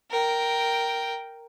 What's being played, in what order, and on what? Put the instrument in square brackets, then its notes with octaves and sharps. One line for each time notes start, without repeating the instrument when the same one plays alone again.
[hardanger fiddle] A#4 G5